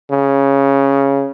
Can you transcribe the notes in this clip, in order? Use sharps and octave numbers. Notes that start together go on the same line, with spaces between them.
C#3